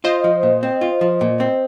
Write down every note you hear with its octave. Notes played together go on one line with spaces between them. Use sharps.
F4 C5 D#5
F3
A#2
C4
F4
F3
A#2
C4